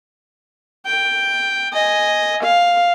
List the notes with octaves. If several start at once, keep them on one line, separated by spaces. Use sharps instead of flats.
G5
D#5 G#5
F5